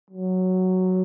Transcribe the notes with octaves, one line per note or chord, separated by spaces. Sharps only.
F#3